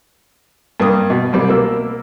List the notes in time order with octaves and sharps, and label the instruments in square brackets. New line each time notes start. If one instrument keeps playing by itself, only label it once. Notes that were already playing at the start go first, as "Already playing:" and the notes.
[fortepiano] G2 A#3 D#6
B2
C2 G3 C4
B2 A#3 E6